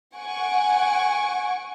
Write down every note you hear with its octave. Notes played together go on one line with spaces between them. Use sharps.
F#5 G#5 C#6 D7